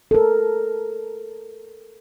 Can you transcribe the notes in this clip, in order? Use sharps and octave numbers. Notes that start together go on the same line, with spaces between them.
A4 A#4